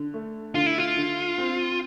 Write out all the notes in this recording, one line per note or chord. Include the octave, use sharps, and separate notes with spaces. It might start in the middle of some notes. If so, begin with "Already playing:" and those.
Already playing: D3
A3
D3 F4
E4
F4
D3
C4